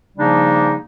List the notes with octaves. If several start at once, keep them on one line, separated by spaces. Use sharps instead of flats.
C#3 F3 G3 A#3 D4 D#4